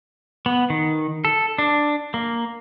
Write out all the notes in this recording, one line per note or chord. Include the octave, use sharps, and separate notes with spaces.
B3
D#3
A4
D4
A#3